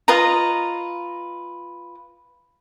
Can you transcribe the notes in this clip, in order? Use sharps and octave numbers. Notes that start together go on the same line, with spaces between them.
F4 B4 D#5 A#5